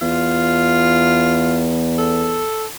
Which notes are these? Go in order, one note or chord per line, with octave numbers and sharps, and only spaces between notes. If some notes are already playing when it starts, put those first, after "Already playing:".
E2 F4
A4